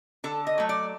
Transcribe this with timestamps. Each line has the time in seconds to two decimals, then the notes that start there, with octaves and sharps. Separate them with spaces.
0.24 D3 A4
0.47 D#5
0.58 F#3 A3
0.69 D5